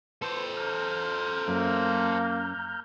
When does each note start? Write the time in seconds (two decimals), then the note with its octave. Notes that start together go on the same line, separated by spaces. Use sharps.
0.22 A4 B4 C5 C6
0.57 A#5 F6 G6
1.48 F#2 A#3